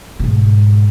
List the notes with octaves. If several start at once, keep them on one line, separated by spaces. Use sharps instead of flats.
G#2 B2